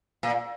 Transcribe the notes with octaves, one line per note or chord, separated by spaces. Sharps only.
A#2